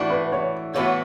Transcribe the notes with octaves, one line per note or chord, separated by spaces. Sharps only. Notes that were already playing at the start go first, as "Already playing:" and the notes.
Already playing: A2 E3 D4 F#4
B4
C#5
A2 E3 B3 D4 F#4 C#5